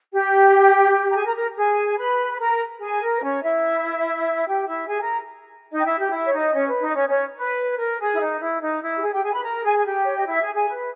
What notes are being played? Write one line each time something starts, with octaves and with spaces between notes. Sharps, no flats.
G4 G5
A#5
G#4 G#5
A#4 A#5
A#4 A#5
G#4 G#5
B4 B5
B5
A#4 A#5
G#4 G#5
A#4
B4
C#4 C#5
E4 E5
G4 G5
E4 E5
G#4 G#5
A#4 A#5
D#4 D#5
G5
E4 E5
G4 G5
E4 E5
C#5
D#4 D#5
C#4 C#5
B4
D#4 D#5
C#4 C#5
C#4 C#5
B4
A#4
G#4
E4
D#4
E4
D#4
E4
G4
G#4
G4 G5
G#4 G#5
B4 B5
A#4 A#5
G#4 G#5
G#5
G4 G5
C#5
D#5
E4 E5
G#4 G#5
G#4 G#5
B4